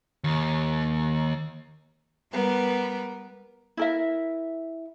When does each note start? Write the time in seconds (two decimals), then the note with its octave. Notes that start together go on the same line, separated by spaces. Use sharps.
0.24 D#2
2.31 G3 B3 A#4
3.77 E4 A#4 E5